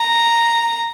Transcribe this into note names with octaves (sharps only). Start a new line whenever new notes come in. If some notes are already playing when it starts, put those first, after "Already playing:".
Already playing: A#5